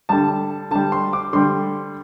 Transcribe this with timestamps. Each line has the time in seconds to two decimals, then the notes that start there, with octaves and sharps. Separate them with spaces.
0.09 D3 G3 A5
0.71 D3 G3 A5
0.92 C6
1.13 D6
1.33 D3 G3 C6